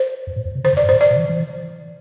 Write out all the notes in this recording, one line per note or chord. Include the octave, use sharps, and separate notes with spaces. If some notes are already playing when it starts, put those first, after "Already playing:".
Already playing: C5
F2
A2
F2
C3
D3 C5
F2
D5
G2
A2 C5
D5
B2
D3
E3
E3